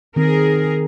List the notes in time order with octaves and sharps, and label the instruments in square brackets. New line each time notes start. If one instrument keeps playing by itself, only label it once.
[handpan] D#3 C4 [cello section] G#4 A#4